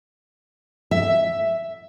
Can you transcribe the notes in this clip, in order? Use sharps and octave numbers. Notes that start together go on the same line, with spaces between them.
E5